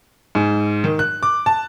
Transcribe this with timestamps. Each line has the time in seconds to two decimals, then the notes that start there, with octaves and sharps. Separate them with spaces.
0.35 G#2
0.84 D#3
0.99 F#6
1.23 D6
1.46 A5